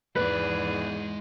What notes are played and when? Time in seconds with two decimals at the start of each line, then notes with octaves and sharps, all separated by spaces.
0.16 E2 G#2 G#3 G#4 B4 D5